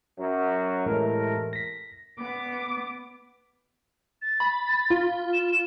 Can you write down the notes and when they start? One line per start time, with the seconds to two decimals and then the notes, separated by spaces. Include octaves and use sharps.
0.18 F#2 F#3
0.86 A2 C3 E3 G#3 A3 A#4
1.53 A#6 B6
2.19 B3 D6
4.22 A6
4.40 B5
4.90 F4
5.33 E7